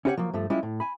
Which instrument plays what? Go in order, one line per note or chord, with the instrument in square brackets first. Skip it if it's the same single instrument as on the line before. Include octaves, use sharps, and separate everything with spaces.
[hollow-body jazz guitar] C#4 E4 G4 A#4 C#5 F#5
F3 F#3 A#3
G2 F3 A3
G3 G#3 C#4 E4 F4
A2
G#5 B5